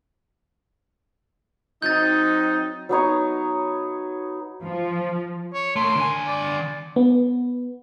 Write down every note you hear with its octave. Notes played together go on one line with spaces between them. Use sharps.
F#3 C4 D#4 G6 A6
F#3 B3 D#4 C#5
F3
C#5
A3 A#3 C6
D3 G#5
D5
B3